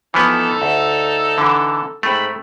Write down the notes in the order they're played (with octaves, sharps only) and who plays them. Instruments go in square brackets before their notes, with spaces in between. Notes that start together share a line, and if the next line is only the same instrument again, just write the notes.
[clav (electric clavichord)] E3 F3 B3 [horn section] D#4 A4
[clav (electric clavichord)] D2
D3 E3
[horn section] G#2 C4 B5 [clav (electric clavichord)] A3